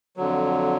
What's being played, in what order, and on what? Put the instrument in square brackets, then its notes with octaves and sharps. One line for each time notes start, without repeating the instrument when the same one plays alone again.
[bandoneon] F2 D3 F#3